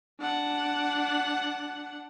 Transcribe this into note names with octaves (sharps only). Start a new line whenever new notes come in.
D4 F#5